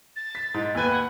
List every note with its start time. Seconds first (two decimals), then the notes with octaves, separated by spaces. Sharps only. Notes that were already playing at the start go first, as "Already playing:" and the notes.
0.16 A6
0.35 B6
0.54 G#2
0.75 D#2 B4 G#5
0.90 F#5